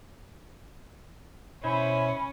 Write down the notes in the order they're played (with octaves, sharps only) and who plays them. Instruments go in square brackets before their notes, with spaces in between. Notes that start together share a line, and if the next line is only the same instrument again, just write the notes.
[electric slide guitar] B2 C5 C#5 [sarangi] C#4 [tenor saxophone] E4 [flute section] B5